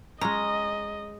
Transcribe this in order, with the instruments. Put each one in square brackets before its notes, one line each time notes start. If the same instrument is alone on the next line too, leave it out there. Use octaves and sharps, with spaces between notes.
[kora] G#3 C#4 [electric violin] D#5 [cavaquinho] A#5